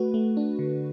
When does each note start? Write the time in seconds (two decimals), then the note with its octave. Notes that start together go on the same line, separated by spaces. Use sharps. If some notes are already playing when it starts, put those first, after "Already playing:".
Already playing: A3 F#4 B4
0.14 A3
0.37 D4
0.59 D3